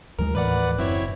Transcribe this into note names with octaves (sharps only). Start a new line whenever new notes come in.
D#2 F3 G#3 A#4
D#2 A2 E3 B4 D5 F#5
F#1 F#2 C4 E4 C#5